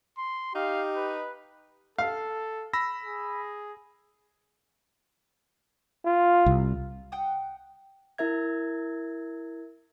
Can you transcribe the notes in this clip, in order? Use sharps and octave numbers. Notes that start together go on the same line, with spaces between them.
C6
D#4 G4 F5
B4
A4 F5
B5 E6 A#6
G#4
F4
C2
F#5 G5 D#6
E4 A#4 E5 G#6